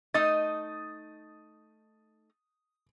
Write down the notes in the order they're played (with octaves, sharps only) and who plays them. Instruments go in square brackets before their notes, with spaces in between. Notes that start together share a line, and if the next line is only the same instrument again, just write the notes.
[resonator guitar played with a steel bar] A3 D#4 D#5 [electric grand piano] D#6 A6